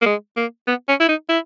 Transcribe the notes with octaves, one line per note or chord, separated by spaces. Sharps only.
A#3
G#3
A#3
B3
C#4
E4
D#4
E4